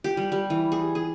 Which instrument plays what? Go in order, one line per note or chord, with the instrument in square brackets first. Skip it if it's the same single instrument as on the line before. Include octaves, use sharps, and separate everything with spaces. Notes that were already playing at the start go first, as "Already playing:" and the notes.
[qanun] G4
G3
G3
E3
G#4
G#4